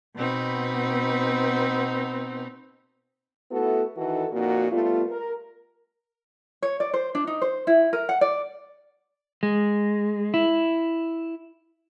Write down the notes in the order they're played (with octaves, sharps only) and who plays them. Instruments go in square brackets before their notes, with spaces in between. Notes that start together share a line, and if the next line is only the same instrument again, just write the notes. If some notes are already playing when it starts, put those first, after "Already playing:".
[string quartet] B2 B3 C4 D#4 B4
[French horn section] A3 B3 E4 F#4 A4
D#3 E3 D#4 F#4 A4
F2 A#2 A#3 D#4 F#4
G3 A3 B3 F4
A#4
[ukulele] C#5
D5
C5
D4
D#4
C5
E4
A#4
F#5
D5
[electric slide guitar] G#3
E4